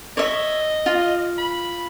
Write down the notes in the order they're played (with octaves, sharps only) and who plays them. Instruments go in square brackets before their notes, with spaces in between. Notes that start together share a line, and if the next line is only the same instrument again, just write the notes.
[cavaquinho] C#5 E5 [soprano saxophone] D#5
[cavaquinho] F4
[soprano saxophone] B5